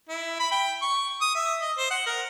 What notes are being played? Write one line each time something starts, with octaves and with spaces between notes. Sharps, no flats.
E4
B5
G5
C#6
D#6
E5
D#5
C5
F#5
A#4